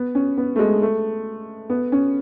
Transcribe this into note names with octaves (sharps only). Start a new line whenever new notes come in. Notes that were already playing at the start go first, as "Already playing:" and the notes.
Already playing: B3
C#4
B3
A3
G#3
A3
B3
C#4